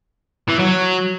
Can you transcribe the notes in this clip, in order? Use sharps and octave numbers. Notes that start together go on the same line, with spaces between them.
E3
F#3